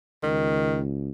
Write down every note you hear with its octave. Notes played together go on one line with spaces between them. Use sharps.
C#2 D#3